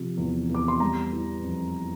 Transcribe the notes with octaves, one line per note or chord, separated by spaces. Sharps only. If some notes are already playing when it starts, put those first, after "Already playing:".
Already playing: C3 F3
E2
E2
D6
C6
G3 A#5
E3
F2